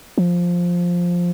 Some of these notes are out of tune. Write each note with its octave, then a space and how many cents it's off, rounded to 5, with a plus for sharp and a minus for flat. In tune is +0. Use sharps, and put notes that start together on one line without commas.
F3 +5